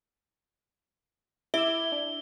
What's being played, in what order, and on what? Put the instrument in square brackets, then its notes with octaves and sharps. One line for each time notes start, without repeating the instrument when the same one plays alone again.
[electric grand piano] E4 [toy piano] E5 [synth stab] D6 E6 [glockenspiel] G7
[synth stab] D4